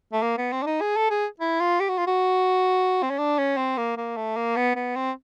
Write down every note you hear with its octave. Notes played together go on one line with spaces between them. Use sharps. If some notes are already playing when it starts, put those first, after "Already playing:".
A3
A#3
B3
C4
D4
D#4
G#4
A4
G#4
E4
F4
G4
F#4
F4
F#4
C4
C#4
D4
C#4
C4
A#3
A#3
A3
A#3
B3
B3
C4